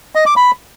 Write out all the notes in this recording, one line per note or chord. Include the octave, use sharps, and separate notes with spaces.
D#5
D6
B5